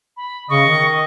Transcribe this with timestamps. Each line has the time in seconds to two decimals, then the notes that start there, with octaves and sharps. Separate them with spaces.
0.17 B5
0.50 C#3 D#5 C#6
0.66 D#3